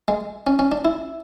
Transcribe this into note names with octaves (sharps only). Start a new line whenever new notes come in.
G#3
C#4
C#4
D4
E4